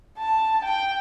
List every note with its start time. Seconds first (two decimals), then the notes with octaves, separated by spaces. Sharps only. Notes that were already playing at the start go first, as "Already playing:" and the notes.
0.18 A5
0.65 G5